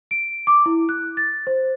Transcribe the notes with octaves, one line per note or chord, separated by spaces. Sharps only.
D7
D6
E4
F#6
A6
C5